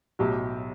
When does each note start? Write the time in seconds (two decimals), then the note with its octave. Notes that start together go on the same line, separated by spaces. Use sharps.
0.19 B1 A2 F#3 G4
0.42 G4